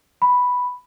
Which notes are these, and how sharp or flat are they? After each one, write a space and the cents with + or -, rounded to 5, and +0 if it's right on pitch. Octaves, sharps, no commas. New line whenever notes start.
B5 +0